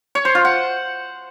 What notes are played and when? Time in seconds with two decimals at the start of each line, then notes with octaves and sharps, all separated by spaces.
0.15 C#5
0.25 C5
0.35 F4
0.45 F#5